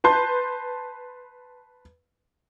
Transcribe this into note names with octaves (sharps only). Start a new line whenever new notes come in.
B4 A5 C6 G6